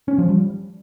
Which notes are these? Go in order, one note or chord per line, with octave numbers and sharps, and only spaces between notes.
C#4
F3
G3